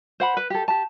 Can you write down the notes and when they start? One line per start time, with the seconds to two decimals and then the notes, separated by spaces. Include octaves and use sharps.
0.20 C5 F#5 B5
0.37 B4
0.50 G4 A4
0.68 G4 A5